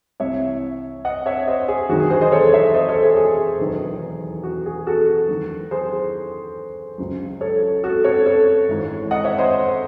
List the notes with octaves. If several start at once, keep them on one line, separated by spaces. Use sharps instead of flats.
C2 C3 E3 C#5 E5
D#5 F#5
C#5 E5
C5 D#5
G#4
E1 D#2 D#3 F#3 F#4
G#4
G#4 C5
C5 D#5
A4 C#5
C#5 E5
C5 D#5
A4 C#5
G#4
G#4
E1 E2 D#3 F#3
F#4
G#4
F#4 A4
E2 D#3 F#3
G#4 C5
C#2 C#3 F#3
A4 C#5
F#4 A4
A4 C#5
A4 C#5
G#1 G#2 E3
D#5 F#5
C#5 E5
C5 D#5